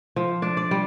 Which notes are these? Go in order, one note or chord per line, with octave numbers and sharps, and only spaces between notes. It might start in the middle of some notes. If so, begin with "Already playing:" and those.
F3
D4
D5
G3